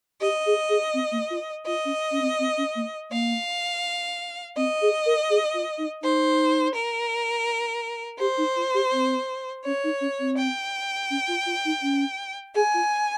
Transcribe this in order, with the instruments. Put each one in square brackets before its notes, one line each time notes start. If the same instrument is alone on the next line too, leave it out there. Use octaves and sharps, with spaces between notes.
[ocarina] G4 [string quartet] D#5
[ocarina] G#4
G#4
C4
A#3
F4
[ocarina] F4 [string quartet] D#5
[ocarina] C#4
C#4
C4
C4
C#4
A#3
[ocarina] A#3 [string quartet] F5
[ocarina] C4 [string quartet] D#5
[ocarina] G#4
A#4
G#4
F4
D#4
[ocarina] D#4 [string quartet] C5
[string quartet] A#4
[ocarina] G4 [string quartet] C5
[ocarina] D#4
F4
G4
C4
[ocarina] C#4 [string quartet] C#5
[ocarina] D#4
C#4
C4
[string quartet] G5
[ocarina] C#4
F4
F4
D#4
C#4
[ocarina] G#4 [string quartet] G#5
[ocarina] F4